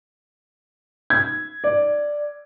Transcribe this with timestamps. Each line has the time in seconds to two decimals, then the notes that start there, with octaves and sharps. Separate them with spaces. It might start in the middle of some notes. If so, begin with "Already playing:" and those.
1.10 G#6
1.64 D5